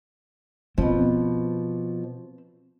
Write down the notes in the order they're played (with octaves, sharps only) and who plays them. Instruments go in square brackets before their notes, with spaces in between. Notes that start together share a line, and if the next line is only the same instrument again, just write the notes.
[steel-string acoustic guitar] B2 F3 [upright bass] C4